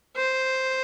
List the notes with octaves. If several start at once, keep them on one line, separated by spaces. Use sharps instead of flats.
C5